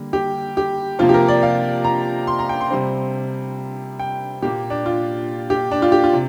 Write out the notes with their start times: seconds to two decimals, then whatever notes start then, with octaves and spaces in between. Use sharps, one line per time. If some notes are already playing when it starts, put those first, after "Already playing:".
Already playing: D3 G3 A#3
0.13 G4
0.57 G4
0.99 C3 F3 A#3 F4
1.09 G4
1.14 A#4
1.28 D5
1.43 F5
1.84 A#5
2.27 C6
2.39 A#5
2.49 G5
2.61 C6
2.70 C3 G3 C4
3.99 G5
4.42 A#2 A#3 G4
4.70 D4
4.86 F4
5.50 G4
5.71 D4
5.82 F4
5.92 G4
6.04 F4
6.13 C3